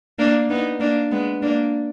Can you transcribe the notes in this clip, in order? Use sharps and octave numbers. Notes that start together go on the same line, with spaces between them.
A#3 D4
B3 D#4
A#3 D4
G#3 B3
A#3 D4